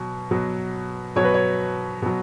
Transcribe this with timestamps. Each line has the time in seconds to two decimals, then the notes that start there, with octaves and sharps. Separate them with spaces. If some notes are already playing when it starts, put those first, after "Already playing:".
Already playing: B2 F#3
0.31 B2 F#3
1.16 B2 F#3 C#5
1.24 B4
1.34 C#5
2.02 B2 F#3